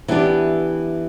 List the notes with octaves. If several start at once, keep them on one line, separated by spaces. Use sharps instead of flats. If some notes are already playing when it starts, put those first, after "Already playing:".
E3 B3 D4 G4